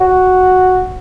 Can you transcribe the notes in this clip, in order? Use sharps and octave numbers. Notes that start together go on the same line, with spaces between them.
F#4